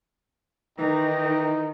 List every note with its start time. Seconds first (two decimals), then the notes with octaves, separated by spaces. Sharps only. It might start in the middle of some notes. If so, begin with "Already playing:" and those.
0.78 D#3 E3 D#4 G5